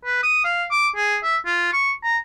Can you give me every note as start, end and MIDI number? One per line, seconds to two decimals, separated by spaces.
0.05 0.20 71
0.23 0.41 87
0.45 0.65 77
0.71 0.88 86
0.96 1.17 68
1.23 1.38 76
1.46 1.72 65
1.73 1.92 85
2.04 2.18 82